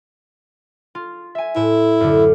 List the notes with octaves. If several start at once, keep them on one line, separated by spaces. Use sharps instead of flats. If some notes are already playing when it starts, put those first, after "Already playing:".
F4
E5 G#5
A2 E4
F#2 D3